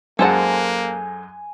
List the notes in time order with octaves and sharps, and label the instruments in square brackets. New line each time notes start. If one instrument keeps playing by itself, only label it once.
[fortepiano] F#2 G#3 F#5 [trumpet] A#3 [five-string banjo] A4 C5 A5 [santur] G#5